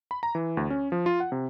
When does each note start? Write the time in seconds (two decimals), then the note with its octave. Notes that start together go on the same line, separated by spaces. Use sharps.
0.11 B5
0.23 A#5
0.35 E3
0.57 D2
0.70 C#4
0.92 F3
1.06 F4
1.20 F#5
1.32 C3